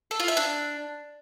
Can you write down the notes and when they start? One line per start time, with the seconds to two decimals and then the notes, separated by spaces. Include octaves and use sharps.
0.11 A4
0.20 F4
0.28 E5
0.37 D4